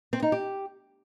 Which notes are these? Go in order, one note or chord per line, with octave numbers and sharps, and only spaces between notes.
C4
D#4
G4